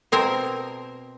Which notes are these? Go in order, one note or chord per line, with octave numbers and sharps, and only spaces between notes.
B2 C4 A#4